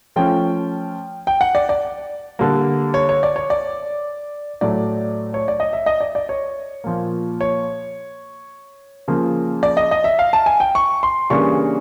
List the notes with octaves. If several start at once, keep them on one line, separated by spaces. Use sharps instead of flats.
F3 A3 C#4 G5
G5
F#5
D5
D5
D3 G3 A#3
C#5
C#5
D5
C#5
D5
A2 F#3 A3 D5
C#5
D5
D#5
E5
D#5
D5
D5
C#5
A#2 F3 A#3
C#5
C#3 F3 A#3
D5
D#5
D#5
E5
F5
A5
G#5
G5
C#6
C6
C#3 E3 G3 A#3 D4 C#6